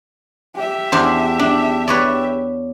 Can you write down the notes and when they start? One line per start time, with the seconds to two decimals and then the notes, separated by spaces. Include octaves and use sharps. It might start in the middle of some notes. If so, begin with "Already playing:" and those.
0.55 G4 E5
0.92 E2 D4 C5
1.39 D4
1.88 B4 C#5 D5